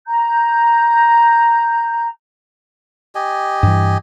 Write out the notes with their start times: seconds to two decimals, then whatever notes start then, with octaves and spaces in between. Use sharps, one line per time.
0.07 A#5 G6
3.15 G4 D#5 G#5
3.63 G2 E3